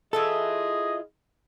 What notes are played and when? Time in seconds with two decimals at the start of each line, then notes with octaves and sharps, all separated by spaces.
0.13 E3 F4 G#4 A4 D#5 E5